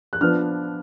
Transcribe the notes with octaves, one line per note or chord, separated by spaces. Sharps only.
F#6
F3 B3 D4 F6